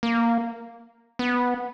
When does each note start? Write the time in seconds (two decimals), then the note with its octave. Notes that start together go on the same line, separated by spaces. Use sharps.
0.03 A#3
1.19 B3